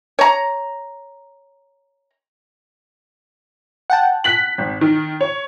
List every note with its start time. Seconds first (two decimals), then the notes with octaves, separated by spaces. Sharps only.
0.19 C#5 A#5
3.90 F#5 G5 A5
4.24 F#6 B6 F#7
4.58 G#1
4.81 D#3
5.21 C#5